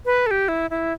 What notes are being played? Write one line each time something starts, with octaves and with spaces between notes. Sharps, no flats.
B4
A4
G4
E4
E4